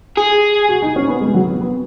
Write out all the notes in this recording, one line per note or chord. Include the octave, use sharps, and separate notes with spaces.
G#4
F#4
D#4
C#4
B3
G#3
F#3
B3
B3